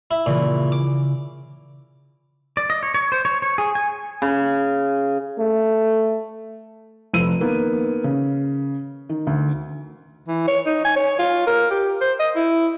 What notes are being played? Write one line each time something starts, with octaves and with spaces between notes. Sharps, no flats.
E4
A#2 C#3 E3
D6
D5
D#5
C#5
C#5
C5
C#5
C#5
G#4
G#5
C#3
A3
F1 F3 B4 E6 D#7
D#3 A#3 B3
C#3
D#3
D2
E3
C#5
D#4
G#5
C#5
F4
A#4
G4
C5
D#5
E4